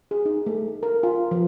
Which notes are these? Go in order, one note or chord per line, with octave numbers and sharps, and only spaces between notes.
G#4
D#4
A3
A#4
F4
F3